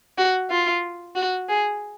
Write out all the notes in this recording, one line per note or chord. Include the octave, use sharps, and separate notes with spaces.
F#4
F4
F#4
G#4